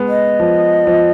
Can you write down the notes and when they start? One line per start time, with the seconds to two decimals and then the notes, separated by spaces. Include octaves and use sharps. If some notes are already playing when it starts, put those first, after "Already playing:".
Already playing: G#3 B3
0.08 D#5
0.40 F3
0.87 F3